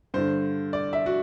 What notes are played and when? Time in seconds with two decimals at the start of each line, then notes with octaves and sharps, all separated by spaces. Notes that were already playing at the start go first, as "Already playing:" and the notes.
0.14 G2 D3 C5
0.73 D5
0.93 E5
1.06 F#4